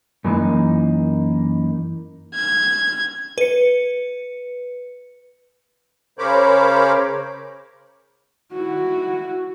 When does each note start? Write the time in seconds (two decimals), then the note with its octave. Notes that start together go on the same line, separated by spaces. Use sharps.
0.25 F#2 E3 A#3 D4 D#4
2.34 G#6
3.38 B4 C#7
6.19 C#3 A#4 C5 C#5 B5 D6
8.53 E4 F#4